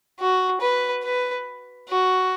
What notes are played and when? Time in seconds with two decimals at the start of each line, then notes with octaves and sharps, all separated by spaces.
0.20 F#4
0.61 B4
1.04 B4
1.89 F#4